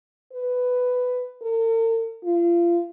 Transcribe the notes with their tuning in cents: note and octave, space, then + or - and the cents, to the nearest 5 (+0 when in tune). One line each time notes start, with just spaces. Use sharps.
B4 +10
A#4 -45
F4 -30